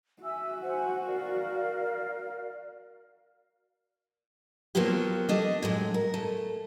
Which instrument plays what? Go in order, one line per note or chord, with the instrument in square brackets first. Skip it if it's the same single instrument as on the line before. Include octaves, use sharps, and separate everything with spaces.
[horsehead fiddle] F#4 [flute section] E5 G#5 E6
[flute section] C5 F#5 G#5
A#4 D5 F5
[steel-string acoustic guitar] F3 F#3 A#3 B3 F4 G4
A3 D4 D#5
A2 F#3 G#3
A#4
A3